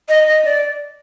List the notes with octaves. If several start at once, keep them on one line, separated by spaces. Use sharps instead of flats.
D#5
D#5
D5